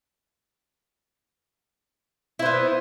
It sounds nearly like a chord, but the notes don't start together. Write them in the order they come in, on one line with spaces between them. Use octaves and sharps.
E4 C5 B3